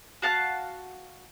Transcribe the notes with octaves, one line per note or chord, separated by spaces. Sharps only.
F#4 F5 A5 F#6